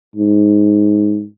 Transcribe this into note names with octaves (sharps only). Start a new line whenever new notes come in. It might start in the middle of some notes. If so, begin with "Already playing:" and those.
G#2